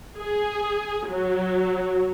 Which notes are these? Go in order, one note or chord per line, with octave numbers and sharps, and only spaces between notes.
G#4
F#3